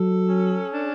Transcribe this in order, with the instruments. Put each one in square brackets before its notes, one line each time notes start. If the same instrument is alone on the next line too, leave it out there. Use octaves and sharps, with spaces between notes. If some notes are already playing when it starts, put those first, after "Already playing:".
Already playing: [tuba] F#3 [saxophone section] A4
[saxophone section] C#4
D4